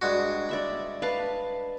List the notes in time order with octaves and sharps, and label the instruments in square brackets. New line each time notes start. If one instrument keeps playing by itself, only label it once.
[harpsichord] G2 G#3 F#4
[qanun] D5 E5 B5
B4 F5 A5